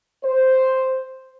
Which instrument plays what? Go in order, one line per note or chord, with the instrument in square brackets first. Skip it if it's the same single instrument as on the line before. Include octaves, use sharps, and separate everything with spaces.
[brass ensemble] C5